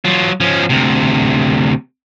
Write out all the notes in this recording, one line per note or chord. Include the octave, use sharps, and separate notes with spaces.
F#3 F4
F3 C#4
D2 C3